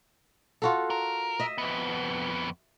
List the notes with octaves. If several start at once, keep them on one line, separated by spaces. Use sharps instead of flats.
F4 F#4 A4
A#4
D#5 E5
F2 B3